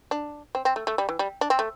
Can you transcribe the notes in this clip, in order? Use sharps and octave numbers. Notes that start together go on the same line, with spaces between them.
D4
C4
C4
A3
A3
G3
E3
G3
D4
C4
A3